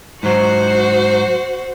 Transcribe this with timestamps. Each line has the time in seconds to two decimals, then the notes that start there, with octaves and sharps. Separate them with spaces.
0.23 G#2 F#3 F#4 C5